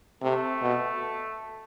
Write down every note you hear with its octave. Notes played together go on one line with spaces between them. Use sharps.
C3 A3
B2